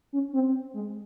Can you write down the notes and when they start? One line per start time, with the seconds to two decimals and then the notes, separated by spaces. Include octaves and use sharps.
0.13 C#4
0.33 C4
0.74 G#3